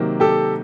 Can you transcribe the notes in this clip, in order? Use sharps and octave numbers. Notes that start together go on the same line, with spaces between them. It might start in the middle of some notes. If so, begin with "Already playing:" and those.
Already playing: C3 D#3 F#3 A#3
G4 A4